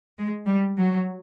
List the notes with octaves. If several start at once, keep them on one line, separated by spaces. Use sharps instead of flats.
G#3
G3
F#3